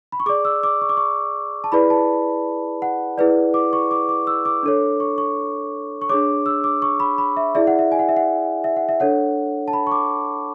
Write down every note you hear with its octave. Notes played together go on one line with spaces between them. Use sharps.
B5
C#6
G#4 D5 D6
E6
D6
C#6
D6
C#6
A5
E4 G#4 B4 D5 B5
A5
F#5
E4 G#4 B4 D5
D6
C#6
D6
D6
E6
D6
D4 A4 C#5
C#6
C#6
C#6
D4 G#4 C#5 D6
E6
D6
C#6
B5
B5
E5
E4 G#4 D5 E5
F#5
E5
G#5
F#5
E5
F#5
E5
F#5
E5
D4 A4 C#5 F#5
A5
B5
C#6
D6